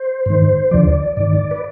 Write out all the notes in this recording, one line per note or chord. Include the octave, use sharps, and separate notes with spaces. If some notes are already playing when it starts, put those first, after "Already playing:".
Already playing: C5
G#2 D#3
D#2 D3 F3 D5
G#2 D#3 D5
B4